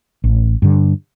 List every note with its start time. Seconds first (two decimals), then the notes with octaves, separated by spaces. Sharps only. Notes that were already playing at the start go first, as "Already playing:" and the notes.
0.24 A1
0.62 G2 D3